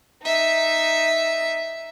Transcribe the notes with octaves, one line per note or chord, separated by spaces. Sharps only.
D#4 E5